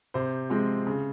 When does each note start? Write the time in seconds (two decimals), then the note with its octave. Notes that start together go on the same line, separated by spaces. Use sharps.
0.14 C3 C5
0.50 F3 G#3 C4
0.87 C#3